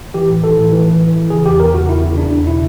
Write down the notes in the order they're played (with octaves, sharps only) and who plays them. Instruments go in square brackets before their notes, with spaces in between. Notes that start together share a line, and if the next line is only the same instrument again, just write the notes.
[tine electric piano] E3 G4
A2
E3 A4
A2
E3
E3
E3
E3
C#3 G#4
E2 G4
E2 A#4
C#3 F#4
E2 E4
C#3
C#3 D4
E2
B2 E4